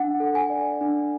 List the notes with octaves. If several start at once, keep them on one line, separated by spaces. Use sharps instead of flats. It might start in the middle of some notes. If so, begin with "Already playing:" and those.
Already playing: D4 F#5
A4
G#5
D5
D4